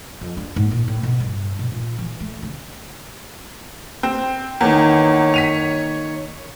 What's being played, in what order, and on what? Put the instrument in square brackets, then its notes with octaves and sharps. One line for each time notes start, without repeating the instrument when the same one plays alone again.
[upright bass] F2
D4
G#2
A#2
A2
B2
G2
B2
A#2
E3
A3
C#3
[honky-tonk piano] C4
[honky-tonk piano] E2 [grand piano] D#3 A#3 [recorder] C#5
[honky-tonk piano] B6 D#7 F7